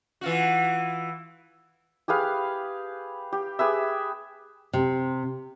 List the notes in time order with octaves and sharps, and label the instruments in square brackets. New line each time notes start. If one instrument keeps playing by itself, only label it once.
[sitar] E3 F4 F#4
[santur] G4 G#4 B4 F5
G4
G4 G#4 B4 E5
[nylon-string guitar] C3